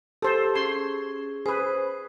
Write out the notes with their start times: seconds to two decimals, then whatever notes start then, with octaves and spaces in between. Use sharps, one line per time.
0.22 G4 A4 C5
0.55 C#4 G#4 C6
1.46 G#4 B4 C5